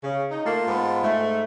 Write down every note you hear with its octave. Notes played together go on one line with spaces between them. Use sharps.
C#3
D#4
A3 A#3 F4 A5
G#2 B3
G#2 A3